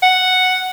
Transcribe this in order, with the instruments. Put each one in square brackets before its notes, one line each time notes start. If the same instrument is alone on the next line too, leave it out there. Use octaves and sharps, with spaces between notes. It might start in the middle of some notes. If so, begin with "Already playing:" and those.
[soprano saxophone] F#5